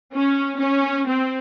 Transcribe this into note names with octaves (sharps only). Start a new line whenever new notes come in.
C#4
C#4
C4